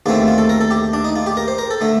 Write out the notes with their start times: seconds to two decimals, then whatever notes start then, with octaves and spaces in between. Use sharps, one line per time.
0.06 D#2 D3 A3 C4 F4
0.28 F4
0.38 A4
0.49 A#4
0.61 A4
0.71 G4
0.93 D4
1.05 D#4
1.16 F4
1.26 G4
1.37 A#4
1.48 C5
1.58 A#4
1.71 A4
1.81 D3 A3